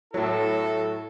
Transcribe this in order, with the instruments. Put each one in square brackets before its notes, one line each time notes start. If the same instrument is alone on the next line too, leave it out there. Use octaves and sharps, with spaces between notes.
[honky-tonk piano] A2 F#3 [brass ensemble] E4 A4